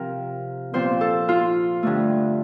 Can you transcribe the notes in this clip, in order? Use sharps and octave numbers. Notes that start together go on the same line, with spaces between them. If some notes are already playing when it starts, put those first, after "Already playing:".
Already playing: C3 F3 C4 A#4
A#2 F3 C4 C5
A4
F4
G2 D3 A3